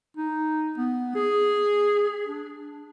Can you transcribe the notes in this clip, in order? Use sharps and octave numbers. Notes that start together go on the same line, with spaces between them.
D#4
B3
G#4
D4